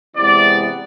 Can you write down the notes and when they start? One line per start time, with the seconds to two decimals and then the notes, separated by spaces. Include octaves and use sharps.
0.16 C3 E3 G#3 B3 D5